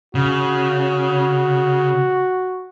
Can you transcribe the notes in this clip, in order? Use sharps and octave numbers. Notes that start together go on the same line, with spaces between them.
C#3 F#4